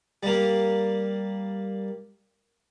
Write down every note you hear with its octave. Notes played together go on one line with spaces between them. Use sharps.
G3 A#3